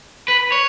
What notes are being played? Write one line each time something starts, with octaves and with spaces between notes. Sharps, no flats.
B4
C#5